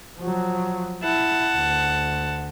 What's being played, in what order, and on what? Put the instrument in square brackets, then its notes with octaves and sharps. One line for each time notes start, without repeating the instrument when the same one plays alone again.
[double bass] F3 F#3
[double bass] E4 [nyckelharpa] F#5 A5
[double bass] D2